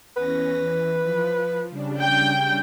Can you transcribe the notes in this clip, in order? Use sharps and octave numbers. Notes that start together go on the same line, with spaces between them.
E2 C#4 B4 A#6
E3
F3
C#3 G3 D4
G5